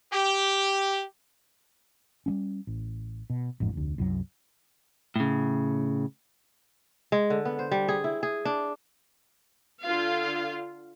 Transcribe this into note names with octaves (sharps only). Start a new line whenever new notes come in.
G4
G3 A3 C#4
A1
B2
A1 F2 G#2
F1 D2
C2 F#2 A2 F#3
A2 C#3
G#3
D3
B3
C5
G3
G#4
E4
G#4
D4
D3 F4 F5